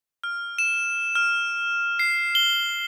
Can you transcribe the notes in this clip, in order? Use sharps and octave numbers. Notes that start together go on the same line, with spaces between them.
F6
E7
F6
C7
G7